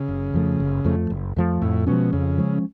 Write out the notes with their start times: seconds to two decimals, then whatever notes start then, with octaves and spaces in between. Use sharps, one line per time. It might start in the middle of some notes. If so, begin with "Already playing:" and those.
Already playing: C#3
0.09 F#1
0.34 F2 F3 A3
0.60 F#1
0.85 F2 F3 A3
1.10 F#1
1.36 F2 F3 A3
1.62 F2 A2
1.87 B2 F3 G#3 C#4
2.13 F2 C#3
2.38 F3 G#3 C#4